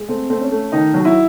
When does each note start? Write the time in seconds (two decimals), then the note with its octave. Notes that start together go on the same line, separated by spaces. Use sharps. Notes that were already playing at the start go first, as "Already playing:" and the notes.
Already playing: G#3
0.08 A3 C4
0.29 A3 C4
0.41 C#4
0.51 A3
0.72 D#3 D#4
0.94 F#3
1.05 E4